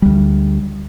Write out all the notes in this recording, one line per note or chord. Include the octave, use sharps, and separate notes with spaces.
D2 G3